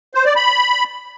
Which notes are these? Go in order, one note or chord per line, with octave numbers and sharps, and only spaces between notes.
C5
D5
B5